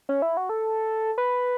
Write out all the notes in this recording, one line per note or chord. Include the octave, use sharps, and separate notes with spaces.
C#4
E4
F#4
A4
B4